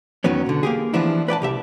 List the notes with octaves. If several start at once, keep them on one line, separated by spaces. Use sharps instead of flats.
E2 D#3 F#3 B3 C#4
B2 D3
A#3 G4 G#4
E3 F3 B3 D4 E4
B4 D5 G5 A5
C2 G4 E5